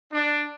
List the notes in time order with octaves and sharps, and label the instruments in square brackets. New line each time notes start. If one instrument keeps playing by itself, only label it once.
[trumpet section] D4